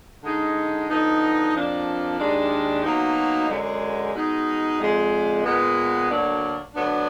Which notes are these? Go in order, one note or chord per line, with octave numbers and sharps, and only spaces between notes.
D3 G#3 D#4
D3 F3 B3 D#4
F2 F3 A#3 D4
D#2 D#3 G#3 D4
B2 F#3 A#3 D#4
F#2 D3 G#3
B2 G#3 D#4
F2 D3 G#3
A#2 G#3 B3
D2 D3 F#3 A#3 D4
D2 D3 F#3 B3 D4